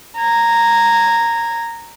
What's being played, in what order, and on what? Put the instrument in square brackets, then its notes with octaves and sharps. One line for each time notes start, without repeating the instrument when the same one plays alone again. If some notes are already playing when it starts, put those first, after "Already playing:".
[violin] A#5 G#6